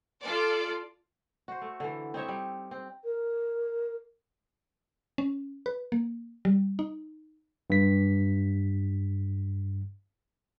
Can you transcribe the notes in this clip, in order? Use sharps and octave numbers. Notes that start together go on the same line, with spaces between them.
F4 A4 D5
F#4 C5
A3
D3 E3
C4 D#4 C#5 E5
G3
C4
A#4
C#4
B4
A#3
G3
D#4
G2 B6